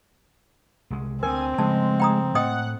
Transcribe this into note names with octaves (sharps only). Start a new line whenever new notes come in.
C2 G#3
D2 C4 A#4 G#5
C#3 F3 G#3 A3 A5
G5 A#5 D#6
A2 D#5 F#5 G5 D#6